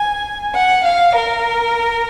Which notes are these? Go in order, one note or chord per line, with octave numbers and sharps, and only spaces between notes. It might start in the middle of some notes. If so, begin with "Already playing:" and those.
Already playing: G#5
F#5
F5
A#4